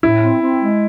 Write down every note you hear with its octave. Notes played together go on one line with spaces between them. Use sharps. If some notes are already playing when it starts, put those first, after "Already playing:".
A2 E4
C4
C4
G#3